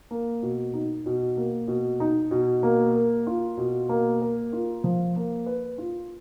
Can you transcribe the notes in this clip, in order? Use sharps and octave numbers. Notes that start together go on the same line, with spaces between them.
A#3
B2
D#4
B2
A#3
B2
D#4
B2
A#3
A#4
F4
B2
A#3
A#4
F4
F3
A#3
B4
F4